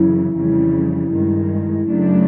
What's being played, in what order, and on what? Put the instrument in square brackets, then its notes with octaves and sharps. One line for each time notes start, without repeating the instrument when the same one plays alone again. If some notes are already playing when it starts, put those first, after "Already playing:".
Already playing: [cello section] F#2 C#3 E3 [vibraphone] E4
[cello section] F2 C#3 E3 G3
G2 D#3 G#3
F#2 C#3 F#3 A3 D4